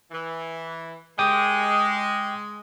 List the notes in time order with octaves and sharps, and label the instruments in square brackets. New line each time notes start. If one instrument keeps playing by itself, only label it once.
[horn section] E3
[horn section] G#3 [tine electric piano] G5 D6 D#6